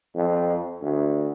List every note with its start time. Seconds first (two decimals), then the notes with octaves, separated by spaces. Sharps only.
0.15 F2
0.81 D2